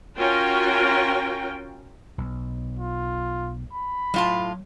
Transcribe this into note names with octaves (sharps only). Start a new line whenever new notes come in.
C#4 F4 F#4 A#4 G5
B1
F4
B5
A2 F#3 F4 A5